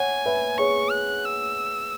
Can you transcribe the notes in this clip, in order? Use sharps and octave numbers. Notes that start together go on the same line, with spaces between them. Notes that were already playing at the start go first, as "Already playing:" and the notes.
Already playing: C#5 F#5 G#5
B4 E5
G#4 C#5 C#6
F#6
E6